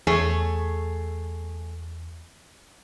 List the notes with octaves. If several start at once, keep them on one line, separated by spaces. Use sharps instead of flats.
E2 A3 G#4 C#5